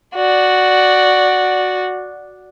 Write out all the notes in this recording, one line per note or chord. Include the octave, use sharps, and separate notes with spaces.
F#4 D5